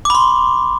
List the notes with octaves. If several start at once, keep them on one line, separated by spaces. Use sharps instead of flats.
B5 C6 D6